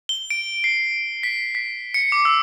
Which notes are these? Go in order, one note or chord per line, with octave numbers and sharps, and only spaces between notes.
G7
D7
C7
B6
B6
C#7
D6
E6